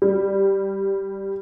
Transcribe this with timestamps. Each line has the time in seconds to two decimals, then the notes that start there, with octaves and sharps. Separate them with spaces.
0.02 G3